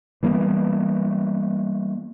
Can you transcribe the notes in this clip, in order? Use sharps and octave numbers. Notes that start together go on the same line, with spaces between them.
E3 G3 A#3 B3